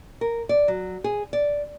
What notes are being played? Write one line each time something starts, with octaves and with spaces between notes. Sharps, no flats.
A#4
D5
F#3
G#4
D5